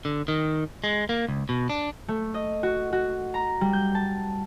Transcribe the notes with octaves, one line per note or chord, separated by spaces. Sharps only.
D3
D#3
G#3
A#3
C#2
B2
D4
A3
D#5
F#4
F#4
A#5
G3
G6
A5